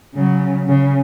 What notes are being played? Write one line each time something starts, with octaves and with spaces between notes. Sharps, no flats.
C#3 F#3
C#3